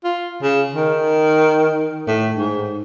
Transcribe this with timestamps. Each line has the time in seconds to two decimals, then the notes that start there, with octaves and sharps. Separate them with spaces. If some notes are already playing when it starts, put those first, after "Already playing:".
0.04 F4
0.43 C#3
0.73 D#3
2.08 A2
2.36 G#2